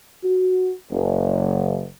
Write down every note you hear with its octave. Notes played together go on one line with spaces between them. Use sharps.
F#4
F#1